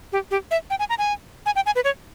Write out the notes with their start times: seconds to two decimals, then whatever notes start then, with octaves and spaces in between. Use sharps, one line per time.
0.13 G4
0.31 G4
0.51 E5
0.70 G5
0.79 G#5
0.90 A#5
0.99 G#5
1.46 G#5
1.56 G5
1.66 G#5
1.76 B4
1.84 C#5